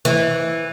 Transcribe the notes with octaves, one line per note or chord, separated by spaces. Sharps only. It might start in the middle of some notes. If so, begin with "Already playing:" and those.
E3